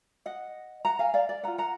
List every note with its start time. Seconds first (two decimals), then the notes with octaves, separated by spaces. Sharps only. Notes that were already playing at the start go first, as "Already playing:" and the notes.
0.26 D#5 F#5
0.85 F#5 A#5
0.99 F5 G#5
1.14 D5 F5
1.29 D5
1.43 F4 B4 F#5 A#5
1.58 F#5 A#5